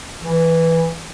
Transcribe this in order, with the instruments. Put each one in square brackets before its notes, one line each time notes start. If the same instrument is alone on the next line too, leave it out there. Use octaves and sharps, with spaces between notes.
[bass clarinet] E3